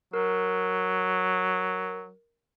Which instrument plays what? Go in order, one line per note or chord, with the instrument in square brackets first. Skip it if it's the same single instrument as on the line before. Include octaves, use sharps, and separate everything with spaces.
[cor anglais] F#3 [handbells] A#4